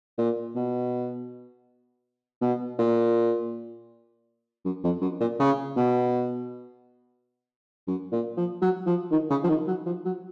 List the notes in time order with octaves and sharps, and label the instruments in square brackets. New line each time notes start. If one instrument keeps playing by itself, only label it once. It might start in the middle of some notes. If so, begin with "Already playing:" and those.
[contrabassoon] A#2
B2
B2
A#2
F#2
F2
F#2
A#2
C#3
B2
F#2
A#2
F3
F#3
F3
D#3
C#3
F3
D#3
F#3
F3
F#3